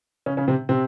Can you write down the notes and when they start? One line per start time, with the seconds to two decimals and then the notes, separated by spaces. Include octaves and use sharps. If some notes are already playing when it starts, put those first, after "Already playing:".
0.26 C#3 C#4
0.37 C#3 C#4
0.48 C3 C4
0.69 C3 C4